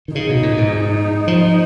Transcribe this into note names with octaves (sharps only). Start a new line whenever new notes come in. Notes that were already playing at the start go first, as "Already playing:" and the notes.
D#3
C#3 D#4
B2
A#2
G#2
F3